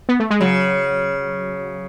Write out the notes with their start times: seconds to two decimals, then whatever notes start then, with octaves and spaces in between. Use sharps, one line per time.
0.09 B3
0.20 A3
0.30 G#3
0.40 C#3 F#3